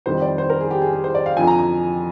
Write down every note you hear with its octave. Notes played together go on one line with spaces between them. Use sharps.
F2 D#3 G3 C5
D5
C5
A#4
G#4
G4
G#4
G#4
C5
D5
F5
F2 D3 F3 G#5
A#5
A#5